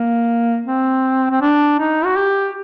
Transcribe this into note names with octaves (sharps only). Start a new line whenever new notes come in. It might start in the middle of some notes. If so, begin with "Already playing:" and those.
Already playing: A#3
C4
C4
D4
D#4
F#4
G4